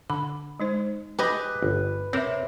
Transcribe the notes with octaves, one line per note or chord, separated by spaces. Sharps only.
D3 B5
G#3 D#4 C5
G4 G#4 B4 D#5
G1
C3 C4 A#4 C5 C#5 E5